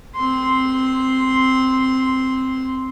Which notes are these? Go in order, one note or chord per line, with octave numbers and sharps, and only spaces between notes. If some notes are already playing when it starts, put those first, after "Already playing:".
C4 C6